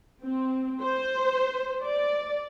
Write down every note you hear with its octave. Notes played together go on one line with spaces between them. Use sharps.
C4
C5
D5